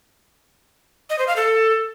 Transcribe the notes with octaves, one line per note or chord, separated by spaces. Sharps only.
D#5
C5
F5
A4